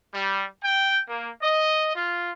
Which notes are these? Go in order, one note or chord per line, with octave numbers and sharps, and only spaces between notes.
G3
G5
A#3
D#5
F4